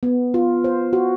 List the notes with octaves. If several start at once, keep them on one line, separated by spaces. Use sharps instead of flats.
B3
F4
C5
F#4